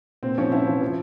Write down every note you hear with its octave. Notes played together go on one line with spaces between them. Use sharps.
A#2 C4
F3 C#4
F3 E4
F3
F3